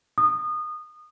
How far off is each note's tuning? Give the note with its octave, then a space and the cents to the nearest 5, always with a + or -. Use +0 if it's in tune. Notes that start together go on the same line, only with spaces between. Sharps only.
D#6 -25